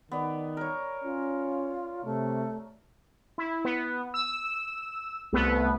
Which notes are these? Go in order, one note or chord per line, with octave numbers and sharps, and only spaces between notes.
D#3 B3 D5
A#4 C#5
C#4 F4
C3 A3
E4
B3
E6
C2 A3 B3 B4